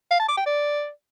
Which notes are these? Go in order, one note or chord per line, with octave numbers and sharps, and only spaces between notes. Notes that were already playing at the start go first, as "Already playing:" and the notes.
F5
A5
D6
G5
D5